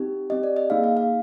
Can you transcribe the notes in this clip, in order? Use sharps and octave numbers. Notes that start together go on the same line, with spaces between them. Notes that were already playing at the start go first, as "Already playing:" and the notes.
Already playing: C4 D#4 G4
C4 G4 D#5
D5
D#5
A#3 D#4 G#4 F5
F5
F5